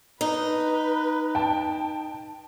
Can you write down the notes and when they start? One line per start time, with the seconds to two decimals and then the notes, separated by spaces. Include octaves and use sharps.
0.21 D#4 B4
1.35 G5 A5